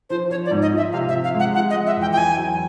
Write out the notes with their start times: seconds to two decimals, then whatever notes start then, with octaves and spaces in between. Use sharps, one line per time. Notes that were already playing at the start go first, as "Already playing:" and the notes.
0.10 F3 C5
0.30 F3 C#5
0.45 D5
0.51 G#2
0.62 D#5
0.72 F3
0.77 E5
0.92 C3 F5
1.09 E5
1.14 F3
1.24 F5
1.35 G#3
1.40 F#5
1.55 F3 F#5
1.70 D#5
1.76 G#3
1.87 E5
1.97 E2 G5
2.12 G5
2.17 F#3 G#5
2.38 F#3